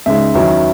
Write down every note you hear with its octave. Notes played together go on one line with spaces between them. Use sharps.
C#2 C#3 G#3 D#4 E5
E2 D#3 F#3 C#4 E4